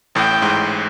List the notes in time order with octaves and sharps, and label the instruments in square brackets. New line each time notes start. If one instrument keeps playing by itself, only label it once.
[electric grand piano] A1 A2 [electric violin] G5
[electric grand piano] G#2